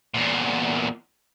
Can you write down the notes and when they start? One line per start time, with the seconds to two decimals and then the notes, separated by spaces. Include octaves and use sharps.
0.14 E2 A#2